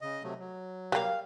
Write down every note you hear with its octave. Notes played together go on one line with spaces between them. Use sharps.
C#3 D#5
C3 F#3 A3
F#3
G3 A#3 F5 F#5